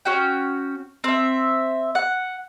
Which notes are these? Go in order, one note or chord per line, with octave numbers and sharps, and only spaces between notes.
C#4 F#4 G5
C4 E5
F#5